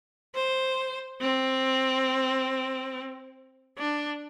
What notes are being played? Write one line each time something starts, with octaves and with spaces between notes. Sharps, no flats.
C5
C4
D4